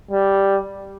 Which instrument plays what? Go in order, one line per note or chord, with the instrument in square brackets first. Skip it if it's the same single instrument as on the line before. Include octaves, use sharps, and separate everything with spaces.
[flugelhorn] G3